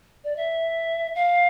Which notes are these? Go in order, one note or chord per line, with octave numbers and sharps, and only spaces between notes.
D5
E5
F5